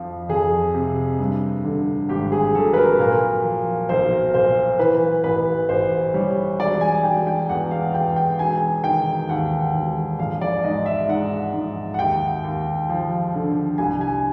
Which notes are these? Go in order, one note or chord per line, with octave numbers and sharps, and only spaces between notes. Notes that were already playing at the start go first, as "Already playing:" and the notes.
Already playing: F2 F3
F2 G#4
C3
G2
D3
G#1 G4
G#4
F#3 A4
B4
A#4
A#2 A#4
F3
B1 C5
A#2 C5
E3 B4
A1 B4
A1 C5
G3 C#5
E1 D5
G#5
E1 G5
G5
E2 F#5
F5
E2 G5
G5
E1 G#5
D#3 G5
D#2 F#5
E1
A#1 F5
D5
G#2 D#5
E5
G#2 F#5
G#2
F#5
D#2 G5
D#2
F3
D3
C2 G#5
G#5